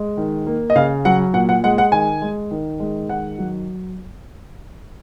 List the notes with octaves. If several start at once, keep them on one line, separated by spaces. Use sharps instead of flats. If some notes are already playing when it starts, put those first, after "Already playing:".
Already playing: G#3
D#3
A#3
D#5
C#3 F5
F#3 F#5
A#2 F#5
F#5
G#3 F#5
F#5
D#3 G#5
G#3
D#3
G#3
D#3 F#5
F#3